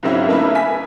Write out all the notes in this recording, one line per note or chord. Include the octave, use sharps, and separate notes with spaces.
G#2 C#3 F#3 C4 E4
C#3 A3 A#3 D#4 E4 B4
G#5 B6